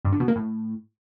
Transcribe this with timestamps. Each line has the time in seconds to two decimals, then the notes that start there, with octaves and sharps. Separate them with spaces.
0.05 G2
0.12 D3
0.20 B2
0.28 A#3
0.36 A2